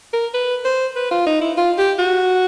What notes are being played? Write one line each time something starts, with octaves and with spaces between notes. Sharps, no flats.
A#4
B4
C5
B4
F4
D#4
E4
F4
G4
F#4